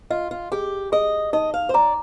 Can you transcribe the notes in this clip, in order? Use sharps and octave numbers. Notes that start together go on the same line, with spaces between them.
F4 D#5
F4
G4 G#4
G#4 D#5
D#4 D#5
F5
C5
D5 A#5